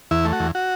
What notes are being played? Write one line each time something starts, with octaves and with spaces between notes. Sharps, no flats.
E2 E4
A3
F#4
E2
F#4